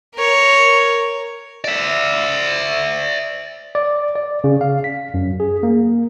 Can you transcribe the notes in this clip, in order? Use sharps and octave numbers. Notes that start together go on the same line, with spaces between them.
A#4 C#5
D5 E5
D5
D5
C#3
F5
B6
F#2
G#4
A#3